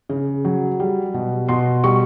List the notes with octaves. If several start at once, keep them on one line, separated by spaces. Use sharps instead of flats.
C#3
F#3
G3
B2
B2 C6
G3 C#6